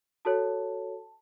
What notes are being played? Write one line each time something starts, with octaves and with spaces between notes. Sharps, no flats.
F#4 A4 C#5 A5